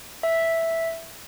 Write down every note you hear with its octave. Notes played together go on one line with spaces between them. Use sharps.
E5